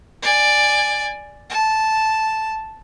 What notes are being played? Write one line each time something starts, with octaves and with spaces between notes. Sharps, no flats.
D5 G#5
A5